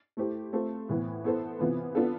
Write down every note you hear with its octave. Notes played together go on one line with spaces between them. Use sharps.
A3 E4 G4 C5
A3 C4 F4 A4 C5
A2 E3 B3
B3 E4 A4 C5
C3 E3 B3 F4 B4
B3 D4 F4 A4